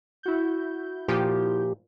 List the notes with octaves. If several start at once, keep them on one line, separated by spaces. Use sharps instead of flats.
E4 F#4 G6
A#2 F3 G4